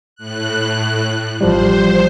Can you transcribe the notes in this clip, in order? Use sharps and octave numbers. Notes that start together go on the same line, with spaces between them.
A2 F#6
A1 F3 G3 C5